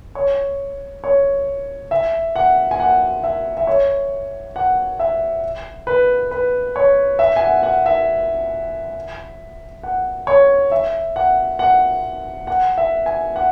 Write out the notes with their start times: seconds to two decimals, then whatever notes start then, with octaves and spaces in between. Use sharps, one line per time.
0.15 C#5
1.04 C#5
1.91 E5
2.36 F#5
2.71 G#5
2.80 F#5
3.24 E5
3.57 E5
3.67 C#5
4.56 F#5
5.00 E5
5.87 B4
6.31 B4
6.76 C#5
7.19 E5
7.36 G#5
7.42 F#5
7.63 F#5
7.86 E5
9.83 F#5
10.27 C#5
10.72 E5
11.16 F#5
11.59 F#5
12.47 F#5
12.77 E5
13.06 G#5
13.36 F#5